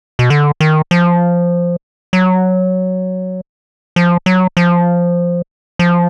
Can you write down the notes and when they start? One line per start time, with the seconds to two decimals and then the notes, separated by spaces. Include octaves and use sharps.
0.19 B2
0.30 D3
0.61 D#3
0.91 F3
2.13 F#3
3.96 F3
4.26 F#3
4.57 F3
5.79 F3